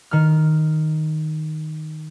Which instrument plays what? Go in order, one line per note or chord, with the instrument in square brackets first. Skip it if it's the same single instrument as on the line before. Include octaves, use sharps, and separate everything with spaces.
[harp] D#3 F6